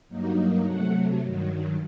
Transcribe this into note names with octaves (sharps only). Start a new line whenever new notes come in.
G2 F#3 A#3 D#4
C3 F#3 A3 F#5
G2 D#3 F#3